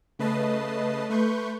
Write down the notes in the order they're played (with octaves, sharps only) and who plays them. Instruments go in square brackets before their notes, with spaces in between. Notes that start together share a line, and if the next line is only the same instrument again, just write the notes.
[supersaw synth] C#3 A3 B4 D#5 A5 C7
A3 B4 C6 C#6 G6